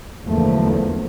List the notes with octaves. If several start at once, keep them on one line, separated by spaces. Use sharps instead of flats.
E2 D3 F3 F#3 A3 A#3